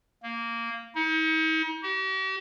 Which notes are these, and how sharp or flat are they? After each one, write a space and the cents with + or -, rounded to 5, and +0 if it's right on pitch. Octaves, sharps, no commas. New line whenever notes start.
A#3 -10
D#4 +40
G4 -45